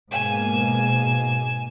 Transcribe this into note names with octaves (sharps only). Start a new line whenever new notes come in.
G#2 B2 A#3 G#5 E7